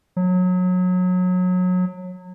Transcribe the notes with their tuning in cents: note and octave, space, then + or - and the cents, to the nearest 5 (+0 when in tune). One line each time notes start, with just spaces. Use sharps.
F#3 -25